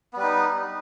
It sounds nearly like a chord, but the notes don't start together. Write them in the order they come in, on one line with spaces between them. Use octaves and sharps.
B3 G3 B4 D#4